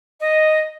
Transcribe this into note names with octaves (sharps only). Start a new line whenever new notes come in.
D#5